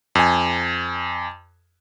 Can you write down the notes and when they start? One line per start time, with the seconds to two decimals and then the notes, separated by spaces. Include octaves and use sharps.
0.15 F2 G#5